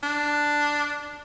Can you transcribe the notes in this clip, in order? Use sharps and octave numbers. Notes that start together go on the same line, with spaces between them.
D4